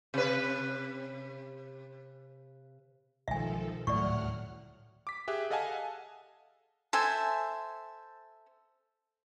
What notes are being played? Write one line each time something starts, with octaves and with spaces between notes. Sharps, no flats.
C3 B4
B1 D#3 F3 G#3 A4 E5 G#5
D#1 D2 A2 F#3 D5 F#5 C#6 F6
D6 B6
G4 G#4 E5 F#6
A4 D#5 F5 F#5 G#5 A5
A4 C5 E5 G#5